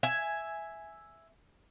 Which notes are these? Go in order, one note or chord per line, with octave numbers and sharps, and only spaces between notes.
E5 G#5